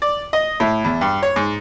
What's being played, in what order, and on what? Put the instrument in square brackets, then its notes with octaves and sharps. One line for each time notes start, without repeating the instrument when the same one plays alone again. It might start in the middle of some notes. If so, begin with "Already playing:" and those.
[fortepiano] D5
D#5
A2
E2
G2
C#5
G#2